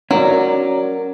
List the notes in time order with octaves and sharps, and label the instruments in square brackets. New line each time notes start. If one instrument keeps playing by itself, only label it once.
[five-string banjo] F#3 [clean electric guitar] C#4 A#4 D5